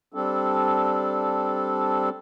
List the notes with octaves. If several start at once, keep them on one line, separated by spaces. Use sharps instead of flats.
G3 C4 D4 A4